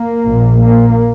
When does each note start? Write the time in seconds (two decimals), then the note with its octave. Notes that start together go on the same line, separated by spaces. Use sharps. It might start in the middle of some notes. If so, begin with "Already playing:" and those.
Already playing: A#3
0.26 A#1 A#2
0.62 A#3